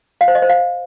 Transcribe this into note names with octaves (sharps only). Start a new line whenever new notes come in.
F5
C5
D#5
C5
F5